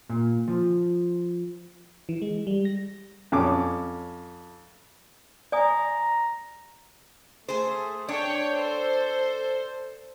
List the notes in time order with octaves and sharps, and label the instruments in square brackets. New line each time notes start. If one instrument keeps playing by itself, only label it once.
[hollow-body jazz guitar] A#2
F3
[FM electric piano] E3
G#3
G3
A#6
[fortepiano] F2 C#4 D6
[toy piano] D5 G#5 D#6 [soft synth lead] A#5
[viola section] A3 [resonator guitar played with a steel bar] G#4 C5
[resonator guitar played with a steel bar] D4 [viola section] C#5 G5
[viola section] A4 C5